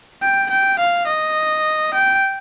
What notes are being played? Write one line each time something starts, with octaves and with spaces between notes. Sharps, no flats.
G5
G5
F5
D#5
G5